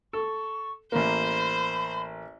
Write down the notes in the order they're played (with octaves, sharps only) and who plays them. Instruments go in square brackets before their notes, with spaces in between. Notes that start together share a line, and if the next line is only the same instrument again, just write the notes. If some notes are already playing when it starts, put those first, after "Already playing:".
[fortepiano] A4 [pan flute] C#6
[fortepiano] A1 A#3 [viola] C5 [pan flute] B5